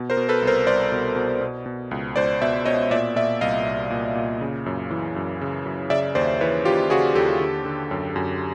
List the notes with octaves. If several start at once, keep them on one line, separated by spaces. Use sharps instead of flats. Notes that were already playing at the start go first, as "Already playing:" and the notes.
Already playing: B2
A#4 C5
B2
A4 B4
C2
A#4 C5
C2 C5 D5
B2
B2
B2
B2
C#2
C#2 C5 D5
B2 D5 E5
B2 C#5 D#5
A#2 D5 E5
A#2 D5 E5
C2 D#5 F5
C2
A#2
A#2
C#3
F#2
E3
F#2
C#3
F#2
C#3 D5 E5
D#2 C5 D5
E3 B4 C#5
D#2 F4 G4
C#3 F#4 G#4
D#2 G4 A4
D3
D3
F#2
F#2